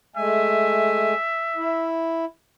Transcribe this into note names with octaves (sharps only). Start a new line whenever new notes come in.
G#3 A3 E5 G#5
E4